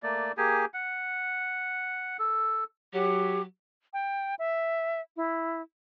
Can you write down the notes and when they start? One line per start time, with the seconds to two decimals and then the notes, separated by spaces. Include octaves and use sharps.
0.03 A3 A#3 D5
0.37 A#3 G4 G#4 G#5
0.74 F#5
2.19 A4
2.93 F#3 G4
3.93 G5
4.39 E5
5.16 E4